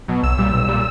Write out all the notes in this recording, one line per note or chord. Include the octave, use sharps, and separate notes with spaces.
B2 F#3
B1 E6
A#2 G3
B1
A#2 G3